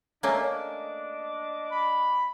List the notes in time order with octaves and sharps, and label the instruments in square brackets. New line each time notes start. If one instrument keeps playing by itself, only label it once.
[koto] A3 A#3 C#4 [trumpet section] D4 D#5 D6
[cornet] B5